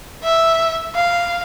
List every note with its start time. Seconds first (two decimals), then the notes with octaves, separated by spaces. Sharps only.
0.24 E5
0.95 F5